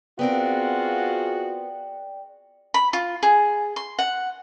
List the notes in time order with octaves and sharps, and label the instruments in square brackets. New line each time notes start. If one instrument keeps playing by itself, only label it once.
[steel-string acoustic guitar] B3 C4 A#4 [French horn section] F4 F#4 G#4 [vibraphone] D5 G5
[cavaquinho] B5
F4
G#4
C6
F#5